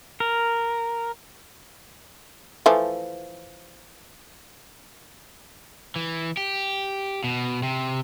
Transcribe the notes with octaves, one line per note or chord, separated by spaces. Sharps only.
A#4
E3 F3 A3
E3
G4
B2
C3